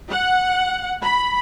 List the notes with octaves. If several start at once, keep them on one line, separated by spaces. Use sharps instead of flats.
F#5
B5